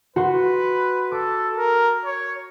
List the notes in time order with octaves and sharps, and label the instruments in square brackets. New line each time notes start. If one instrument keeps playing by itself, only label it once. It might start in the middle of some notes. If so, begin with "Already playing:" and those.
[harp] F#4 C6 [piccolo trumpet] B4
[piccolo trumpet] A4 [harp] D6
[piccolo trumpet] A#4
C#5